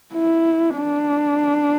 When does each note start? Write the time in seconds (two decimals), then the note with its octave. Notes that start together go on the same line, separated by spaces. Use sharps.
0.13 E4
0.76 D4